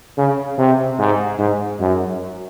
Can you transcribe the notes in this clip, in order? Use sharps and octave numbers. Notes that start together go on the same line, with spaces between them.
C#3
C3
G#2
G#2
F#2